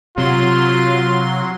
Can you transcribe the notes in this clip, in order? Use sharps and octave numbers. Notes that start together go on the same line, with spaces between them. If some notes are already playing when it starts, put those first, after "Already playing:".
C3 F#3 F4 C6